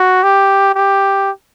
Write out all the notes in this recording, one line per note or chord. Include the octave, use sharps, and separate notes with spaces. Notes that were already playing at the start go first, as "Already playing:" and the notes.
Already playing: F#4
G4
G4